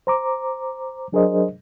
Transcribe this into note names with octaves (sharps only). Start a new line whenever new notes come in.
C5 A#5 D6
F#3 D4 G#4 A#4 C5 D#5